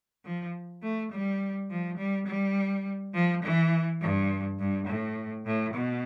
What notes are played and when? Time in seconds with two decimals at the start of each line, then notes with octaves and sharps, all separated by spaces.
0.24 F3
0.82 A3
1.12 G3
1.70 F3
1.98 G3
2.27 G3
3.13 F3
3.42 E3
4.01 G2
4.59 G2
4.88 A2
5.46 A2
5.74 B2